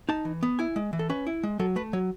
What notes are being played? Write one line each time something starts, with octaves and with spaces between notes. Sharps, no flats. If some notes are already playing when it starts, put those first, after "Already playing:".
D#4 A5
E3
B3
E4 G#5
G#3
E3
A4
C#4 B4
E4
G#3
F#3 A4
A3 B4
F#3 C#5